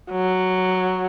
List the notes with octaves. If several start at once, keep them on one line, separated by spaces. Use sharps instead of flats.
F#3